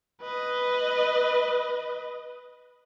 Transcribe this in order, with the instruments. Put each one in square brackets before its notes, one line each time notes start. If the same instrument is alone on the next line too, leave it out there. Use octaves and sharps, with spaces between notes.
[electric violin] B4 D#5